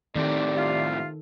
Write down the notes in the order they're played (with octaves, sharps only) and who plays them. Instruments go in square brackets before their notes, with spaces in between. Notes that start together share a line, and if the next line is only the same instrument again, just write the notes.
[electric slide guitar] A2 C4 G4 [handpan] D#3 A4 [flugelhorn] D5
[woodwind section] C3 F4 F5